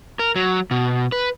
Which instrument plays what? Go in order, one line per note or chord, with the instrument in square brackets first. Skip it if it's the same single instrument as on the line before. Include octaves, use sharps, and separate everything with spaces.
[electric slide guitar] A#4
F#3
B2
B4